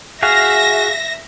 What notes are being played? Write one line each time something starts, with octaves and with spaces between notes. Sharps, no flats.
F#4 G#4 E5 F5 A#6